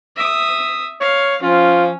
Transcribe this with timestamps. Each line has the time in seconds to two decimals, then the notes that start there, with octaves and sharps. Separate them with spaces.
0.16 E5 D#6
1.01 C#5 F5
1.42 F3 C#4 F4